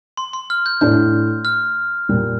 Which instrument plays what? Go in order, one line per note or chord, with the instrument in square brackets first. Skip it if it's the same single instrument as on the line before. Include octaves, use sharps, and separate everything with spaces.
[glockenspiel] C6
C6
F6
G6
[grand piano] A2 A3 D4 [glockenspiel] G6
[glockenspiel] F6
[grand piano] A#2 G3 A#3